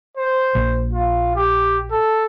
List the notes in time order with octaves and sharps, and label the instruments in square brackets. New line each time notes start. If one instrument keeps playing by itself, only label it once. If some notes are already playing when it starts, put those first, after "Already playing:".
[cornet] C5
[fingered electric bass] A#1
[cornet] F4
G4
A4